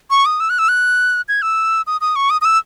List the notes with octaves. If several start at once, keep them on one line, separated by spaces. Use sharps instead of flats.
C#6
D#6
E6
F#6
E6
F#6
G#6
E6
D#6
D#6
C#6
D#6
D#6
E6